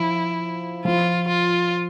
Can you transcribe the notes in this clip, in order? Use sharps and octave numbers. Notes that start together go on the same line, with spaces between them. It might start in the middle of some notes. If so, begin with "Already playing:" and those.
Already playing: F3 E4
F3 F4
F4